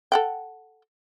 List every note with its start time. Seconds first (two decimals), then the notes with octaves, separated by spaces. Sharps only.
0.12 A4 F#5 G5